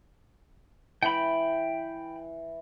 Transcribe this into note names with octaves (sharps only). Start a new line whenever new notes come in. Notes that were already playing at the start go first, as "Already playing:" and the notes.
E3 G5 B5